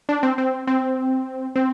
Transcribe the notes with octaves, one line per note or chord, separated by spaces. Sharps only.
D4
C4
C4
C4
C4